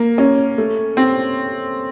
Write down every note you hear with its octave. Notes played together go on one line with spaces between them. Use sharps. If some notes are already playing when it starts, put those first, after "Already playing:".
Already playing: A#3
C#4
A3
C4